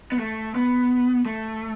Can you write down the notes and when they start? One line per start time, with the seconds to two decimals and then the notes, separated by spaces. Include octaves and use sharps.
0.12 B3
0.19 A3
0.55 B3
1.26 A3